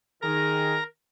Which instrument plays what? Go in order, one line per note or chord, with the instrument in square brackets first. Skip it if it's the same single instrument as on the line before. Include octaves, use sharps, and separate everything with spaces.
[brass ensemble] D#3 G#4 [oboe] A#4 [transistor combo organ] A#5